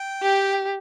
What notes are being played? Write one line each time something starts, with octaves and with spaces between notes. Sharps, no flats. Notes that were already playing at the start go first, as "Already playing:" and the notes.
Already playing: G5
G4